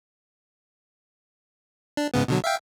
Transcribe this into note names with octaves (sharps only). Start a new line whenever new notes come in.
D4
G#2 C#3 B3
B2 D3 F#3
E5 F5 G5